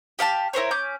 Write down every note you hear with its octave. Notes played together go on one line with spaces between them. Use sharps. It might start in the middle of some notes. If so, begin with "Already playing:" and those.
G4 F5 F#5 A5
E4 A#4 C5 C#5
C#4 D6 G6